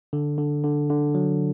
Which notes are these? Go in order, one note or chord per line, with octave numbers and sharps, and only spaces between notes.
D3
D3
D3
D3
F#3